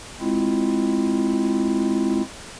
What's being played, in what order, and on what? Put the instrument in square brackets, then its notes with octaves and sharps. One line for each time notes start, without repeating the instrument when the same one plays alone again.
[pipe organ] G#3 C4 E4 F4